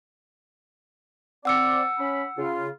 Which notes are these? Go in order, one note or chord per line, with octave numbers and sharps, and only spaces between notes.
C4 D5 F#5 E6 C#7
C#4 B5
C#3 F4